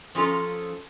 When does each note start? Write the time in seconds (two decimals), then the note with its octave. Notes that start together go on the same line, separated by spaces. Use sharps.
0.15 F3 C#4 F4 A4 A#5